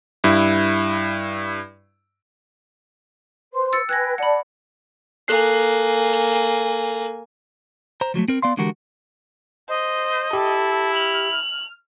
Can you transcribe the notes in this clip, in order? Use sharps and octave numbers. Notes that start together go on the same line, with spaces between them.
G2 E4
B4 C5 C6
E6 A6 C#7
B4 G5 G#5 F#6 G#6 A#6
D5 F#5 A5 B5
A#3 A4 G#5 F#6 C7
C5 A#5
F3 F#3 G#3 A3
C4 A#4
B3 D5 F5 C6
D3 E3 G#3 F#4 G4 A#4
C5 D#5
E4 G4 A4
F6 F#7